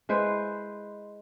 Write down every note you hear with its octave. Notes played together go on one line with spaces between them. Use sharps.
G#3 E4 B4 C5